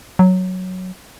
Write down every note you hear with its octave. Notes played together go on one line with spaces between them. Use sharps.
F#3